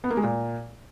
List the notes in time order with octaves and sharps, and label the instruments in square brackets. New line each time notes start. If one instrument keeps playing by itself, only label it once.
[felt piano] B3
A#3
G#3
A#2